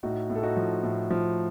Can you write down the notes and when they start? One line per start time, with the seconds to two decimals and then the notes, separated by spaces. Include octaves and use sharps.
0.03 A2 D#4 F#4
0.30 A2
0.36 A4
0.43 D#4 F#4
0.57 F3
0.83 A2
1.10 F3